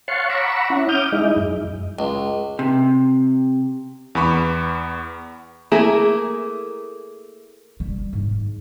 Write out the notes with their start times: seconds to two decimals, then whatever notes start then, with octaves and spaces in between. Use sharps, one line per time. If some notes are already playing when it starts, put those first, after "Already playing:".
0.08 C#5 F5 F#5 A5 C6 C#6
0.30 F#5 A#5 B5 C#6 D6 E6
0.70 C#4 E4
0.89 D6 D#6 F6 G6
1.12 G#3 D#4 E4
1.36 F#2
1.99 C#2
2.59 C3
4.15 E2 B3 B5 C#6 D6
5.72 A3 A#3 E4 G#4
7.80 G3
8.13 G#2